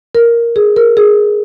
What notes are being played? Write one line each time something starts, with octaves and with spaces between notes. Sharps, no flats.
A#4
G#4
A#4
G#4